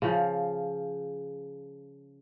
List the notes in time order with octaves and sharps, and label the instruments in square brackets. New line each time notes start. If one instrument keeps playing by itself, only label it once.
[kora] C#3 F3